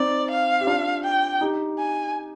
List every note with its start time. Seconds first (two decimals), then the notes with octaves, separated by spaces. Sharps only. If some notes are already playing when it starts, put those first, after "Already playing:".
Already playing: C4 D#4 D5
0.30 F5
0.61 G4
0.67 D4 F4
1.05 G5
1.41 D#4 G4
1.78 G#5